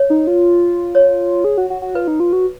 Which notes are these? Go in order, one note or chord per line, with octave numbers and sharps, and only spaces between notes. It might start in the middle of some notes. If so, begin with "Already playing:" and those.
Already playing: C#5
D#4
F4
C#5
G#4
F#4
F#4
F#4
F4 B4
D#4
F4
F#4